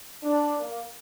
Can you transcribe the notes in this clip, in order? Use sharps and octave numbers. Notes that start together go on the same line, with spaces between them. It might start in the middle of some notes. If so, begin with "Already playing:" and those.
D4
A#3